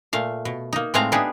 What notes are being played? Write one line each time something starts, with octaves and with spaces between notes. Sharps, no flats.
A#2 A3 F5
B2
A#3 D#4
A2 G#3 A3 C4 F5 A#5
B3 D4 D#4 G4 G#4